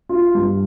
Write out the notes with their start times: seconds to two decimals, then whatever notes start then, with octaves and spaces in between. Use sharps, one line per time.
0.09 F4
0.35 G2